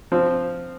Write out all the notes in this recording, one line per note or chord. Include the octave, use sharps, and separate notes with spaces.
F3 C4